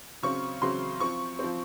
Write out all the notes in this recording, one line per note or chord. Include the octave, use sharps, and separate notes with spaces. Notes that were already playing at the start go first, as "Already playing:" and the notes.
C#3 F#3 C4 C#6
C#3 F#3 C4 C6
F3 C4 C#6
F3 C4